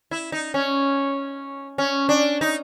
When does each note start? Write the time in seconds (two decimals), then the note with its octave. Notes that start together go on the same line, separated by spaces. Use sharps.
0.11 E4
0.32 D#4
0.54 C#4
1.78 C#4
2.09 D4
2.41 D#4